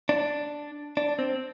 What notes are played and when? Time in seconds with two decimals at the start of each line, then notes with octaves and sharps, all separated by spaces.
0.09 D4
0.97 D4
1.19 C4